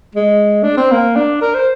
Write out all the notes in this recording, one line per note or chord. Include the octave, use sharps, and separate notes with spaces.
G#3
D4
C4
A#3
D4
A#4
C5